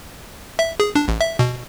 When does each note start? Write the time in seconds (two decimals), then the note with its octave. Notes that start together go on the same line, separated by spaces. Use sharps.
0.59 E5
0.80 G#4
0.95 D4
1.08 A1
1.21 E5
1.39 B2